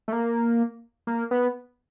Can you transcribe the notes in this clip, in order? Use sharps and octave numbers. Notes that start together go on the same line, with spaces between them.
A3
A#3
A#3
B3